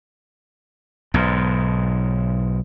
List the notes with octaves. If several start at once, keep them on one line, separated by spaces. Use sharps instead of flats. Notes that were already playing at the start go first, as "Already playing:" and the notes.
B1 G#2